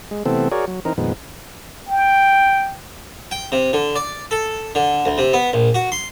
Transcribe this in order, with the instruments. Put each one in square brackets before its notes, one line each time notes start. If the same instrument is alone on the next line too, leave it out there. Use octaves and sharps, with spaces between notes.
[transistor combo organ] G#3
C3 E3 A3 B3 C4 A4
F#4 G#4 A#4 C#5 D5
F#3
E3 C4 D#4 A#4
F2 A#2 D#3 G#3 B3
[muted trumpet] G5
[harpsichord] G5
C3
D3
D5
A4
D3
D2
C3
B3
A#1
F#4
C6